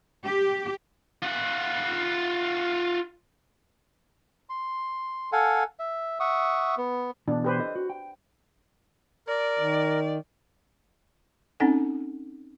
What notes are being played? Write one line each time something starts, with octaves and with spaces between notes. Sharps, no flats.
G4
F4 F#5
C6
A4 F5 F#5 G#5
E5
E5 F#5 C#6 D#6
B3
B2 E3 D4
G4 B4 C5
A4 D#5
F#4
G5
A#4 D5
D#3
C4 C#4 D#4 A4 F#5 G#5